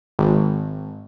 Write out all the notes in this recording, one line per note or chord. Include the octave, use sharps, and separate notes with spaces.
G#1